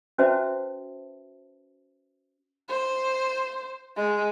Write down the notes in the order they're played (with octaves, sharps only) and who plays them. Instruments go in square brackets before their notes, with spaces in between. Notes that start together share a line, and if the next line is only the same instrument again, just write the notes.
[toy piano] C#4 F#4 B4 C5 E5 A5
[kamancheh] C5
G#3